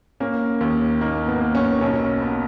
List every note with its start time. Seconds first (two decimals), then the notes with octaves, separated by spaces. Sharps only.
0.20 A#3 C#4
0.61 D#2
1.01 A#3 D#4
1.28 B3
1.41 A#3
1.55 C#4
1.81 B1 C#4
2.22 B3